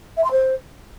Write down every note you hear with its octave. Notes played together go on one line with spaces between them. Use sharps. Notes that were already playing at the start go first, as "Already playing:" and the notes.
E5
C6
C5